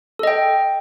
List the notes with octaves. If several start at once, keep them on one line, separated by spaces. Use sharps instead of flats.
A4 D#5 G5